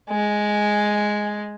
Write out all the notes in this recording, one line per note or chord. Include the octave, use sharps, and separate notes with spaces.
G#3